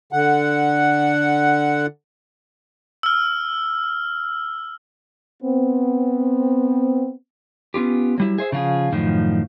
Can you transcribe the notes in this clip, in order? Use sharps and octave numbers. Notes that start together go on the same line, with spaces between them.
D3 F#5
E6 F6
B3 C4
B3 C#4 F4 G4
F#3 G3 E4
G#4 C5 E5
C#3 F3 F4 F#4 G#4
F#2 A2 D#3 F3